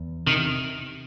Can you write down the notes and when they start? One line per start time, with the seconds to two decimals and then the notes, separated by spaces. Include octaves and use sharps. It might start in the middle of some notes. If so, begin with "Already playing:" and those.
Already playing: E2
0.27 C3 D#3